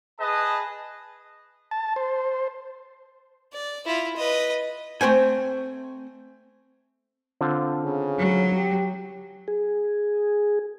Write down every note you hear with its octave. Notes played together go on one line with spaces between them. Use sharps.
G#4 B4 D#5 A5
A5
C5
D5
E4 F4
B4 D#5
A3 C4 C5 G#5
D3 C4 F4
C#3
F#3
G4
G#4